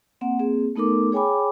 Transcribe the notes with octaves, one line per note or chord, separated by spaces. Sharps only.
A#3 C4 F#5
A#3 C4 G#4
A3 B3 D#4 A4 A#4 D6
G#4 C#5 G5 G#5 B5 D6